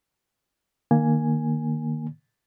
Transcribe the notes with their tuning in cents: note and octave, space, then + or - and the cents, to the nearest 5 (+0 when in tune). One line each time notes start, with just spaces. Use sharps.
D#3 -30 A#3 +0 G#5 +0